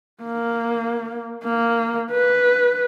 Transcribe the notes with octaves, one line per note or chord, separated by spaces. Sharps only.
A#3
A#3
B4